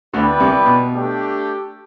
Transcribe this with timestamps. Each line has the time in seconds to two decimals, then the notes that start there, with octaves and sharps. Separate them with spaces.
0.14 D2 D3 B3 E4 B4 D5 G5
0.40 C2 C3
0.66 B2
0.93 A3 D4 G4